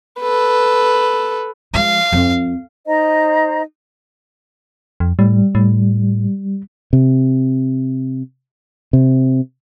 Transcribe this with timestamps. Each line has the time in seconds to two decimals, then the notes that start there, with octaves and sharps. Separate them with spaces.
0.20 A4 B4
1.74 F3 G#3 F5
2.12 F2
2.87 D#4 C5 D#5 A#5
5.00 F2
5.19 A2 G3
5.55 A2
6.93 C3
8.93 C3